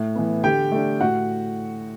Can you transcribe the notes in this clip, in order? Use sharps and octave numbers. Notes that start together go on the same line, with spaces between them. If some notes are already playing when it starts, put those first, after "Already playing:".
Already playing: A2
E3 B3
D3 G4 G5
A3 D4
A2 F#4 F#5